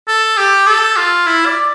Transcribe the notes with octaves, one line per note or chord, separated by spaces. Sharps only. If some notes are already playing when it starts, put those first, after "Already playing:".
A4
G4
A4
F4
E4
D5